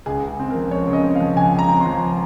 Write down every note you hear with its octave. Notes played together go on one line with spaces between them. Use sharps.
C#2 G#4
C#3 G#4
C4
F3 A#4
C#2 C#5
C#3
D#5
C4
F5
F3
C#2 G#5
C#3
A#5
C4
C6
F3